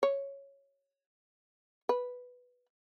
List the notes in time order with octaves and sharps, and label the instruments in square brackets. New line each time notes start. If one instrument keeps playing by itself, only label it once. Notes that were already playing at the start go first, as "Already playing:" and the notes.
[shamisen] C#5
B4